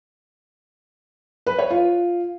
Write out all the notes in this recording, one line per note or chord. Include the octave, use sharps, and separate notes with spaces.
B4
C#5
F4